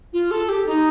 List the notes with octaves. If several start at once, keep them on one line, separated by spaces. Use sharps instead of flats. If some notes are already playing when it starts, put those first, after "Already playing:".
F4
A4
G4
D#4